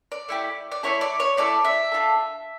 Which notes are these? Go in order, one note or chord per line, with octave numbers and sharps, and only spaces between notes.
D5
A3 E4 G4
D5
A3 E4 A4 C#5
D5
C#5
A3 E4 A4 D5
E5
D4 F4 A4